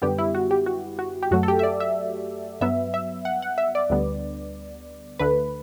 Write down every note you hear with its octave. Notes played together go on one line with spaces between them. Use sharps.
F#2 D3 G3 B3 G4
E4
F#4
G4
F#4
F#4
G4
F#2 F#3 A3 F#4
A4
G4
E5
D5
E5
G2 F#3 B3 E5
E5
F#5
F#5
E5
D5
D2 D3 G3 B3
D2 D3 A3 B4